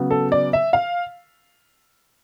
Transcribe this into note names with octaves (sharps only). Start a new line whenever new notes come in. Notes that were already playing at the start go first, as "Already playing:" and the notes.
Already playing: C#3 F#3 B3
A4
D5
E5
F5